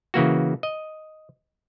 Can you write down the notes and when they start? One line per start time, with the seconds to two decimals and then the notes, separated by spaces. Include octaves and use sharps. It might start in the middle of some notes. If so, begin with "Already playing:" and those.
0.14 C#3 E3 A#3 F#4
0.63 D#5